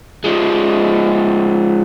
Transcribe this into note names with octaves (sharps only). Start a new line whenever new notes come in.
F3 G#3